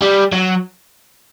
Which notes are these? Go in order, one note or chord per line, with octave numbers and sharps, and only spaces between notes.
G3
F#3